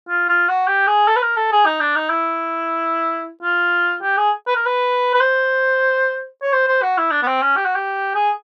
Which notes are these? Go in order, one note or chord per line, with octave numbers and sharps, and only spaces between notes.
F4
F4
F#4
G4
G#4
A4
B4
A#4
A4
G#4
D#4
D4
D#4
E4
F4
G4
G#4
B4
A#4
B4
B4
C5
C#5
C5
C5
F#4
E4
D4
B3
C4
C#4
G4
F#4
G4
G#4